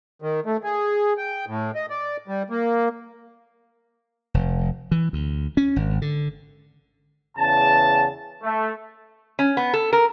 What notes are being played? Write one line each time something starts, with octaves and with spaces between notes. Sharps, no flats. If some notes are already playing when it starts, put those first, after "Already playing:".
D#3
A3
G#4
G5
A2
D#5
D5
G3
A#3
F1
E3
D2
C#4
G#1
D3
E2 C#3 A5
A3
C#4
B3
A4
A#4